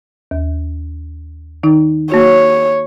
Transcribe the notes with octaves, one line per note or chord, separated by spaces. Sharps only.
D#2
D#3 D#4
A#3 F#4 C#5